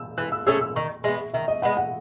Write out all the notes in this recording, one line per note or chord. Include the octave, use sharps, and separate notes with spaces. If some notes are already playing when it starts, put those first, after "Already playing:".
Already playing: E6
E3 F#6
E6
A3 C#4 G#4 E6
E6
D#3 C#6
G#3 B3 E5
D#3 E5
D#5
G#3 B3 F#5
F#5